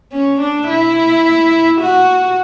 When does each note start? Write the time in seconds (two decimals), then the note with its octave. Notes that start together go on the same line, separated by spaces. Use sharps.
0.12 C#4
0.40 D4
0.69 E4
1.81 F#4